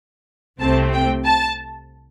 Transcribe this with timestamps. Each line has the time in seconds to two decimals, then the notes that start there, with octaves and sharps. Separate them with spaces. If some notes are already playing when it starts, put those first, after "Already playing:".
0.60 C2 C3 A3 C4 A5
0.92 G5
1.24 A5